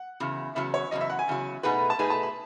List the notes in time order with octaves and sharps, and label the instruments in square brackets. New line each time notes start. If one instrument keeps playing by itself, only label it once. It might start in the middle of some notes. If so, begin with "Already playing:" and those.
Already playing: [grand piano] F#5
[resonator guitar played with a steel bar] E2 C#3 F#3
[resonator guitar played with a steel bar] E2 C#3 F#3 [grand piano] E5
[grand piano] C#5
[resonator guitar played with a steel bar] E2 C#3 F#3 [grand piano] D#5
[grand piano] E5
F#5
G#5
[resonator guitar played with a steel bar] E2 C#3 F#3
[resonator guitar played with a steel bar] B2 A3 D#4 G#4 B4 [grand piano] F#5
[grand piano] A5
[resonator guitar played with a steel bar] B2 A3 D#4 G#4 B4 [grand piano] G#5
[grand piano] A5
B5